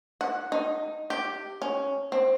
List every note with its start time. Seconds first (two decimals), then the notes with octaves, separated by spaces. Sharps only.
0.21 F#5
0.52 D#4
1.10 G4
1.62 C#4
2.12 C4